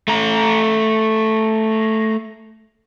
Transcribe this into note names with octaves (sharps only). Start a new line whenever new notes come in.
A3 A#5